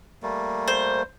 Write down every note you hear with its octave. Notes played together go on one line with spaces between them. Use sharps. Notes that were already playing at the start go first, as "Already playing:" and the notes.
G3 A3 A#3
C5